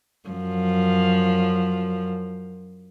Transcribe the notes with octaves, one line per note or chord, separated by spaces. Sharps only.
F#2 F3